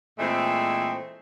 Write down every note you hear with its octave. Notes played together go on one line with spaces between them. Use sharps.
A#2 E3 G#3 A3 C4